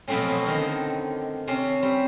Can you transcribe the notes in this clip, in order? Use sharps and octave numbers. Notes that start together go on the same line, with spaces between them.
B2 F3 F#3 A3 C4 C#4
B2 F#3
D3 D#3 C4 D#4
C3 C4 C#4
G3 C4